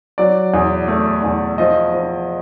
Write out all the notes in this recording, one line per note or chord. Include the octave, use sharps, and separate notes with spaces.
F#3 D5
E2
A3
E2
F3 D#5
F3